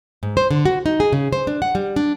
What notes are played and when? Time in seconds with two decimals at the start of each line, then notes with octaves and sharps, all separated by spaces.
0.23 G#2
0.37 C5
0.51 D3
0.65 F#4
0.86 D#4
1.00 G#4
1.12 C#3
1.33 C5
1.47 D4
1.62 F#5
1.75 G3
1.96 D4